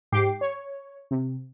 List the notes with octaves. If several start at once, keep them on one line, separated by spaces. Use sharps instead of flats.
G#2 G4 G5 D6 C7
C#5
C3